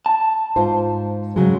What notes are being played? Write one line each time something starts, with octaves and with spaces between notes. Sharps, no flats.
A5
G#2 F4 C5
C#3 F#3 G#3